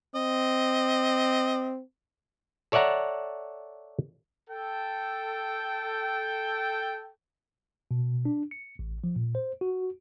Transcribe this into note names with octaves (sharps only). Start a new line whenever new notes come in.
C4 D#5
A4 C#5 D5 E5 F#5 A#5
A4 G5
B2
D4
C#7
A1
F3
A#2
C5
F#4